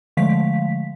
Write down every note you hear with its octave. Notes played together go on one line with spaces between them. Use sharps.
D3 F3 G#3 A3 F5 B6